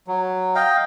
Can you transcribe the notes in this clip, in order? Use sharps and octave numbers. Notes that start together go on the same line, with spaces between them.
F#3
D#5 F5 G5